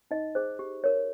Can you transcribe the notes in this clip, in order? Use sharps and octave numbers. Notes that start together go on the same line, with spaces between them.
D#4 D#5
G#4 C5
G4
A#4 C#5